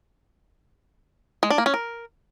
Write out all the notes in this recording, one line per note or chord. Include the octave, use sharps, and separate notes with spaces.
G#3
D4
A#3
C#4
A#4